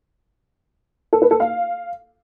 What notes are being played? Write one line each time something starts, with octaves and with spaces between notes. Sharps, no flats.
A4
B4
A4
F5